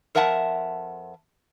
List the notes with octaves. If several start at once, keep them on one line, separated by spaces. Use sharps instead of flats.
F2 A#4 E5 F#5 G#5 A5